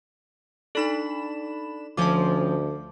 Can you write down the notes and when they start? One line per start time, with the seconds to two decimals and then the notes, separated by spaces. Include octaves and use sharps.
0.75 D4 D#4 A4 B5 E7
1.97 D2 F3 C#4 F4 A5 D6